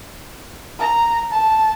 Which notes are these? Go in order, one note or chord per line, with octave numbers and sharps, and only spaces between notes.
A#5
A5